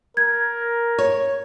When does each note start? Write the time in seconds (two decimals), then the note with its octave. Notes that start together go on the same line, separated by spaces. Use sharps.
0.17 A#4 G#6
0.99 C#5